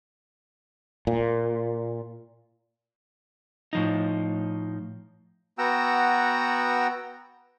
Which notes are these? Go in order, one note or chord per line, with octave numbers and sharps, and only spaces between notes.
A#2
A2 F3 D#4
B3 F#4 F#5 G5 A#5 E6